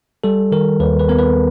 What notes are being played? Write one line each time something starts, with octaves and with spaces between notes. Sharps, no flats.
G3 A4
D#3 A#4
D#2 B4
B4
B3 A#4
B4